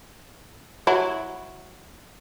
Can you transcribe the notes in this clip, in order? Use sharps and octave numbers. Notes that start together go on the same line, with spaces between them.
F#3 E4